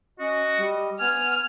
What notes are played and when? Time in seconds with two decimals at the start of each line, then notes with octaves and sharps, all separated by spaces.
0.19 C#4 F#4 D#5
0.57 G3
1.00 B3 G#5 F6